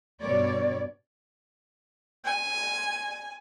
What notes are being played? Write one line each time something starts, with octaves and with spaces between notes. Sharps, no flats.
G2 B2 B3 C#5 D5
G#5